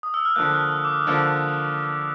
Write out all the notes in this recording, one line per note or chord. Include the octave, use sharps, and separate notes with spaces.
D#6
E6
F6
D3 F3 A#3 F#6
F6
E6
D6
D#6
D3 F3 A#3 E6